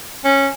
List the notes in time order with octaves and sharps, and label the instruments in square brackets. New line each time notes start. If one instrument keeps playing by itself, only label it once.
[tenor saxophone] C#4